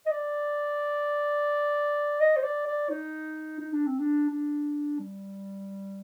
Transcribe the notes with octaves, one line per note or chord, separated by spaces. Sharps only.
D#5
D5
D#5
C5
D5
D5
D#4
D#4
D4
C4
D4
D4
G3